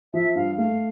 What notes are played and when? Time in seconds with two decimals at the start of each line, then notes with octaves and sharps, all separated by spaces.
0.14 F3 E5
0.36 G2 F5
0.58 A3 F5